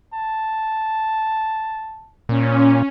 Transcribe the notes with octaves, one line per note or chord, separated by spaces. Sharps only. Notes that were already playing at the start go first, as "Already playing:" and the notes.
A5
A#2 C#4